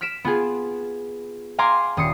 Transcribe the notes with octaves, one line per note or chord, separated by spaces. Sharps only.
F6 B6 D7 E7
B3 F4 G#4
F5 G#5 A#5 C6 D6
D#1 D#6 C7 C#7